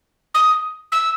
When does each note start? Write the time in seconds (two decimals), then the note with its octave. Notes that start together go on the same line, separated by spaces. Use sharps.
0.34 D#6
0.92 E6